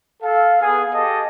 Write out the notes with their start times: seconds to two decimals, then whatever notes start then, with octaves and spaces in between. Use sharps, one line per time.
0.23 A4 F5
0.61 B3 G#4
0.93 G4 A4 D#5 A5